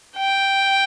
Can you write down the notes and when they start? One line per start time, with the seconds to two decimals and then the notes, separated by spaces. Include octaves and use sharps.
0.17 G5